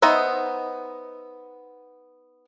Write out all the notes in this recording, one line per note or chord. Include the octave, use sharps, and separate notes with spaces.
B3 D#4 C5 D#5 E5